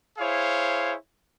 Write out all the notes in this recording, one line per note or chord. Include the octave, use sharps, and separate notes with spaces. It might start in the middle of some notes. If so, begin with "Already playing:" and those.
E4 G#4 C5 C#5 F5